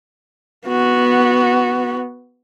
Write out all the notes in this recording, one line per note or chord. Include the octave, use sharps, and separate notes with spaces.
B3 F#4